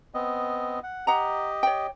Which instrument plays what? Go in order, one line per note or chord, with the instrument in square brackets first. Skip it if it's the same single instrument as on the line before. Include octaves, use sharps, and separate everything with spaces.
[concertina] B3 C4 D#5
F#5
[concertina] G4 D#5 [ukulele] F#5 A#5
[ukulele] C#5 G5